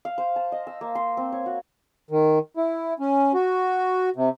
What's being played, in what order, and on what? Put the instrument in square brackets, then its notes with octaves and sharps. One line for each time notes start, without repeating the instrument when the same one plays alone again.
[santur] F5
C5
A5
D#5
E6
A#3
C6
C4
C#5
F#4
[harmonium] D#3
E4
C#4
F#4
C3